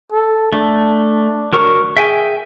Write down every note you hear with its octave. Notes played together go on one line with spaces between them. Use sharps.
A4
A3 D4
F#3 A#4 C#6
G#4 E5 G5 G#5